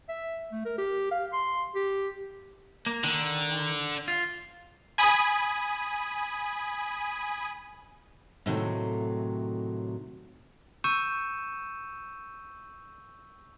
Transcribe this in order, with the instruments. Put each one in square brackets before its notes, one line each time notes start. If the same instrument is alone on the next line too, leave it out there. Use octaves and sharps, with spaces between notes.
[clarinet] E5
A3
A#4
G4
F5
C6
G4
[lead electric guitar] A#3
[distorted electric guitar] D3 [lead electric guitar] D#3
[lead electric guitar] F4
[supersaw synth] G#5 B5 D#6
[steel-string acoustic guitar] A2 C3 D#3 F#3 A3
[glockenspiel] C#6 E6 G6 C#7 D#7 E7